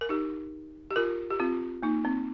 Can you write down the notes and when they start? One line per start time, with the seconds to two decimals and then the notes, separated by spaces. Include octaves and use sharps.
0.01 A#4
0.09 D#4 G4
0.91 G4
0.96 F4 A#4
1.30 G4
1.40 C4 F4
1.83 A#3 D#4
2.05 C4